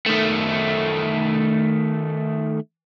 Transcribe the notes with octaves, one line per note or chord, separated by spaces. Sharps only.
D#3 A3